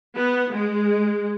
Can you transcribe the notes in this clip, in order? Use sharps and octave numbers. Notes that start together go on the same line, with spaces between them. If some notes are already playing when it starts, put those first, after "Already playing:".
B3
G#3